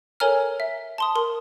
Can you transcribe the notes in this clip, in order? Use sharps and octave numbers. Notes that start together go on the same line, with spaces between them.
A4 A#4 C#5 G#5 A#5 F6
E5
A5 C6 D#6
A#4 C6